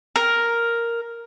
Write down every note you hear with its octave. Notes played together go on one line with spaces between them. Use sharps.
A#4